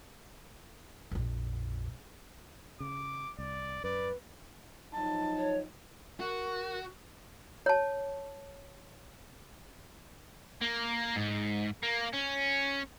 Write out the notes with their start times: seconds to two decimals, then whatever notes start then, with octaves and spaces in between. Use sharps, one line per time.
1.11 A#1 F2
2.80 C#3 D6
3.38 C2 D5
3.84 F#2 B4 D5
4.94 F3 F#3 D#4 A5
5.38 C#5
6.20 F#4 A#4
7.66 C#5 A5
10.62 A#3
11.16 G#2
11.83 A#3
12.14 C#4